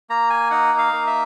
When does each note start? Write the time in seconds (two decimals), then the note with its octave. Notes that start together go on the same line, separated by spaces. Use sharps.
0.10 A#3 A#5
0.30 G#5
0.51 D#4 F#5
0.78 F5
0.93 A#3
1.07 E5